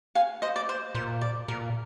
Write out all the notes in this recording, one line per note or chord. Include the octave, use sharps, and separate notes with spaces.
F5 G#5
C5 D#5
D5
C5
A#2 C5
D5
A#2 A#4